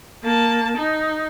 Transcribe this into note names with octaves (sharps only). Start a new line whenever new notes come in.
A#3 A5
D#4